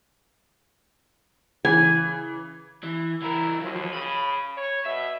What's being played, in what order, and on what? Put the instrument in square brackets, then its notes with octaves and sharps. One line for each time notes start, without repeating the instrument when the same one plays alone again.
[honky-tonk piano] C#3 E3 [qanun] G#5
[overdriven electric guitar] E3
[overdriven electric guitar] E3 A#4 [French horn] E4
[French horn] D#2 [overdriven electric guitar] F3 F#3
[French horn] C#3 [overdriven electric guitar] B5
[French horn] C#5
[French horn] B2 [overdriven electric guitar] E5